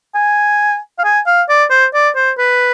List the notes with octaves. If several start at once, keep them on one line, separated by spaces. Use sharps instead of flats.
G#5
F5
G#5
F5
D5
C5
D5
C5
B4